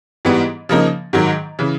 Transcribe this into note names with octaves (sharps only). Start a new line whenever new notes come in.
G#2 E3 G3 B3
C#3 F3 A#3 D#4
G#2 D#3 F#3
C#3 E3